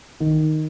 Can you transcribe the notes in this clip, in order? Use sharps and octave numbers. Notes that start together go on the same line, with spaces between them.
D#3